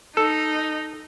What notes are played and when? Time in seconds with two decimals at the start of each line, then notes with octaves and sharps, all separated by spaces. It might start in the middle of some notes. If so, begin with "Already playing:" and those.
0.17 D#4 A4